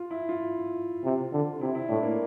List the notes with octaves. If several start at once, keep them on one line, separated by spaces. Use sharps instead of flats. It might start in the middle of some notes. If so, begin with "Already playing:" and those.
Already playing: F4
E4
F4
C3
D3
C3 E4
E4
A2 D4
A#3